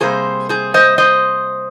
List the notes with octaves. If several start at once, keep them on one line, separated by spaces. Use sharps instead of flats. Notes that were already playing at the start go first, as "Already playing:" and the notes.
C3 G3 A#3 G#4 C5
G#4 C5
C5 D#5
C5 D#5